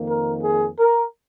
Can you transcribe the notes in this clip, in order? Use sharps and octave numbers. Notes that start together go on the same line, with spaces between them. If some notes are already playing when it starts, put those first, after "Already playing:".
Already playing: F2 D#3 A#3
A#4
G#4
A#4